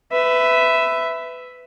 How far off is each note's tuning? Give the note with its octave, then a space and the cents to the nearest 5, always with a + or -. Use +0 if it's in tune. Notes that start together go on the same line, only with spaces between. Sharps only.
B4 +25 E5 +0